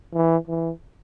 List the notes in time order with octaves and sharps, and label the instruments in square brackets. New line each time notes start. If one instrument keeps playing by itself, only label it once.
[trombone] E3
E3